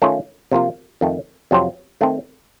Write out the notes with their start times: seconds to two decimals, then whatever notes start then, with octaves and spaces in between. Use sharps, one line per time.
0.02 D#3 A3 C#4 F4
0.51 C3 F3 A#3 F4
1.01 F2 D#3 A3
1.51 F2 C3 F#3 C4 F4
2.01 D#3 A3 C4